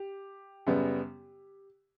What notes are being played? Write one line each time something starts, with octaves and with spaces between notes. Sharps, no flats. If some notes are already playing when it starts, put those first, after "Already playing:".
Already playing: G4
F#2 C#3 G3 B3